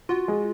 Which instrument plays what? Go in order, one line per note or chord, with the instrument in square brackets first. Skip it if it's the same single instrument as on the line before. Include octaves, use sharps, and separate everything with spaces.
[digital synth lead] F4 [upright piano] F#4
[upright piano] G#3